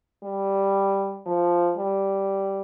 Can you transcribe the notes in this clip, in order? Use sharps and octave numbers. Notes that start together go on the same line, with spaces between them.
G3
F3
G3